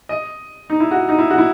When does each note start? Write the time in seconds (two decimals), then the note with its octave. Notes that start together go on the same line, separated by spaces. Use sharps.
0.09 D#5
0.70 D#4
0.80 E4
0.91 F#4
1.09 D#4
1.18 E4
1.31 F#4
1.38 E4